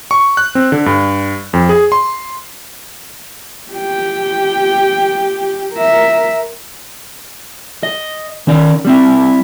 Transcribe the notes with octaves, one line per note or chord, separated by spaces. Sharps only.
C#6
F#6
C4
D3
G2
F2
G#4
C6
G4 G5
A#4 E5
D#5
D#3 C#4 D5
G3 C4 E4